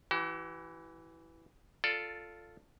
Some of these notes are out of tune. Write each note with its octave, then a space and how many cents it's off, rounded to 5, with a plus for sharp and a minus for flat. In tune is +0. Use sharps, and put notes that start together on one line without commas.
E3 +0 F#4 +45
F4 +0 A4 +5 D5 +0